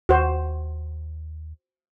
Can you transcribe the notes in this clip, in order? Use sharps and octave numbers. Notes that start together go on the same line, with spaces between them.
D#2 F#4 C5